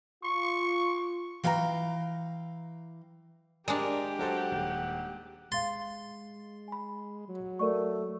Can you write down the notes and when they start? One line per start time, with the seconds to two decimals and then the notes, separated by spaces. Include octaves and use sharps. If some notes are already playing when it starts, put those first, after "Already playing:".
0.24 F4 C#6
1.44 E3 F5 G5 G#5 A#5
3.68 G#3 D4 G4 A#4 D5
4.19 F#3 A4 C5 F#5
4.52 D#1
5.52 G#3 F5 C6 A6
6.68 G#5 B5
7.28 F#3
7.59 A3 A#4 D5 C#6